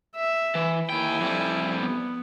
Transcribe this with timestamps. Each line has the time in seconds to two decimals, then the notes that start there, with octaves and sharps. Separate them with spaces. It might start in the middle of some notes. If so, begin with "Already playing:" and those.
0.16 E5
0.55 E3
0.89 D#2 E4 G5 G#5
1.21 F2 G3
1.79 B3